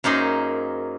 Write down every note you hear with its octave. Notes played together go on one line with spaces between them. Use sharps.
F#2 A#3 D#4 G#4 C5